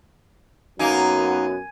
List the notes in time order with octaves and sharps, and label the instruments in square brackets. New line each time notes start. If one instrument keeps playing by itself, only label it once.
[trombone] F#2 [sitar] A#3 D#4 [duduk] B3 [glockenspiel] G#5 G#6 D#7